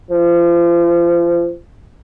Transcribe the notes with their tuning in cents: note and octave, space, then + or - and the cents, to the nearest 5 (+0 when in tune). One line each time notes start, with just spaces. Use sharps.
F3 -30